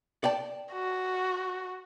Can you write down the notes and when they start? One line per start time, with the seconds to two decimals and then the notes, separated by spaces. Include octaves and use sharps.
0.24 D5 G5 A5
0.73 F#4